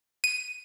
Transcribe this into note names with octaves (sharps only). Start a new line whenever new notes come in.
D#7